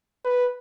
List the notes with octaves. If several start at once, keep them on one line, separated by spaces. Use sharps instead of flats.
B4